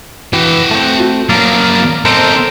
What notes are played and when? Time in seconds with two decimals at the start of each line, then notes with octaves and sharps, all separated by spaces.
0.33 E3 F#4 G5
0.71 A3 C4
1.29 F#3 A#3 A#4 D5 F5
2.05 C4 D#4 A4 A#4 C5